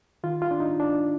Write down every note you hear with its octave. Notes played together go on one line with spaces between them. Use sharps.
D#3 F4
F4
D4
D#4
D4